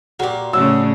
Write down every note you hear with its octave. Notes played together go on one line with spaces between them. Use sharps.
A#2 C#3 F#4 G4
A2 C#3 F#3 D4 E6